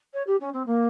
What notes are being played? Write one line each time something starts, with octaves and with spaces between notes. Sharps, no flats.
C#5
G4
C#4
C4
A#3